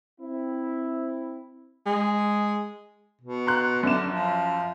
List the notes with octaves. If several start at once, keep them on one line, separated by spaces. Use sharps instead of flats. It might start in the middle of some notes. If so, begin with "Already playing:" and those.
C4 E4
G#3
B2
A#5 C6 F#6
F#2 D3 E7
F3